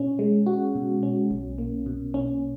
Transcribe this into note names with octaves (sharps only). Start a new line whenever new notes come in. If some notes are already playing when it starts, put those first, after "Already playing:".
Already playing: B2 C#4
G#3
F#4
B2
C#4
B1
A#3
B2
C#4